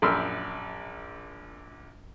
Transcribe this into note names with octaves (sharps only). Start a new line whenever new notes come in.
A#1 F#2 B5 C6 E6 F6